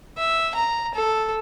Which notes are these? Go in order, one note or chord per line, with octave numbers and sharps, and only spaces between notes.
E5
A#5
A4